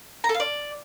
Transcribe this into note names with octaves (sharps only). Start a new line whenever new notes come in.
A#5
A4
F5
D5